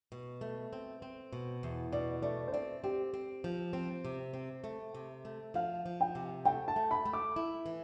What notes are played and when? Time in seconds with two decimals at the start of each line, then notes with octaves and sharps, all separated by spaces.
0.12 B2
0.41 A3
0.73 C4
1.02 C4
1.33 B2
1.63 E2
1.92 B2 D5
2.22 A3 D5
2.48 C5
2.52 C4 D5
2.84 C4 G4
3.14 C4
3.44 F3
3.73 C4
4.05 C3
4.34 C4
4.64 A3
4.95 C3
5.25 A3
5.54 F3 F5
5.86 F3
6.01 G5
6.15 C3
6.45 A3 G5
6.68 A5
6.76 A3
6.91 B5
7.05 A3
7.13 D6
7.36 E4
7.66 E3